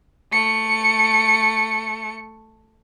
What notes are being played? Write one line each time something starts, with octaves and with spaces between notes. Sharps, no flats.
A3 C#7